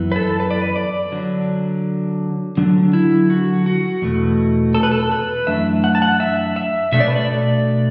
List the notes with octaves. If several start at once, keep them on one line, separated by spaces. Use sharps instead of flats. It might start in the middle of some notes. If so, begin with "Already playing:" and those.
Already playing: F#2 E3 B3
B4
A4
B4
D5
B4
D5
D3 F#3 D4
D3 F#3 D4
E4
F#4
F#4
E2 B2 A3
A4
B4
A4
B4
F#2 E3 A3 D4 E5
F#5
A5
F#5
E5
E5
B2 A3 D4 E5
D5
B4
D5